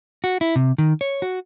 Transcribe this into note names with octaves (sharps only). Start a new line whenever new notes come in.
F#4
E4
C3
D#3
C#5
F#4